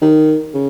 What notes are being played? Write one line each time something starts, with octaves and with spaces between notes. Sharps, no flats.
D#3
C#3